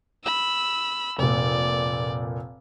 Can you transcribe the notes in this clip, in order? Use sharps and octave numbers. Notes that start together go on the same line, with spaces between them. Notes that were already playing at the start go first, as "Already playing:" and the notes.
B5 E6
F1 A#2 D5